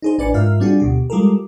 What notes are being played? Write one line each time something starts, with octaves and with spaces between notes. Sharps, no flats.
D#4 G#4 C5
A1 D4 B4 D5 G#5 C#7
G#2 F4 A#4 E5 F6
G3 C4 D4 F4 F#4 G#4
D2 B2 G4
G3 G#3 F4 G4 A4 A#4